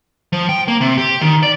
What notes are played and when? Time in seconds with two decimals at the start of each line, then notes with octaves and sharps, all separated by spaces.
0.33 F3
0.49 G5
0.68 A#3
0.81 C3
0.98 G4
1.21 D#3
1.43 D5